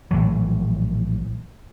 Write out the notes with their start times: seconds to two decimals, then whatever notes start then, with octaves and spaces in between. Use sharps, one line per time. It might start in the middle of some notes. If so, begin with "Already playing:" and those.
0.11 A#1 A2 E3 F#3